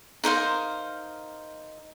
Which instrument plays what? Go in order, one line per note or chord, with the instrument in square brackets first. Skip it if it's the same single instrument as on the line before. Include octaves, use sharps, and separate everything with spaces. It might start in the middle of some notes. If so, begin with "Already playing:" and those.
[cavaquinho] D#4 A#4 C5 F5